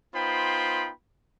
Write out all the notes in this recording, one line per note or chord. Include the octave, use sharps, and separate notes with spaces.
B3 D#4 F4 C5 G5 B5